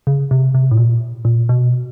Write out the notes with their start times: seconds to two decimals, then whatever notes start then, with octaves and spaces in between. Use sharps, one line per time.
0.07 C#3
0.31 C3
0.54 C3
0.71 A2
0.77 A#2
1.25 A#2
1.49 B2